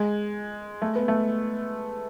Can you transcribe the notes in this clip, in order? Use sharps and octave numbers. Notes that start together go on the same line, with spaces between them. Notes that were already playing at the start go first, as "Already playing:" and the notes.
Already playing: G#3
A3
B3
A3